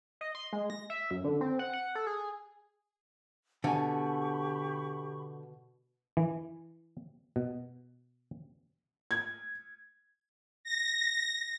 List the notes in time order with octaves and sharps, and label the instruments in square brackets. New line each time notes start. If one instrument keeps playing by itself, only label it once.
[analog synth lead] D#5
C6
G#3
A#6
E5
F#2
D3
C4
F#5
F#5
A4
G#4
[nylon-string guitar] B2 G#5 [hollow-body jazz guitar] D3 [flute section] G4 B5 C#6
[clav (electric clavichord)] E3
B2
[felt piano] G#6
[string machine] A#6